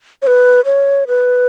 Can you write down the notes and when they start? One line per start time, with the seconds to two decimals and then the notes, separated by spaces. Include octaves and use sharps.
0.22 C#5
0.27 B4
0.65 C#5
1.08 B4